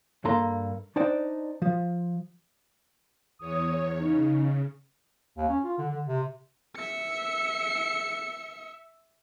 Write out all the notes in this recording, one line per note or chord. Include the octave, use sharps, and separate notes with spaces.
G2 A#3 A4 A#5 C6
D4 D#4 C5 D5 G5
F3
E2 C#5 D#6
C#3 D#4
D#2
C#4
F4
D3
D3
C3
E5 C#7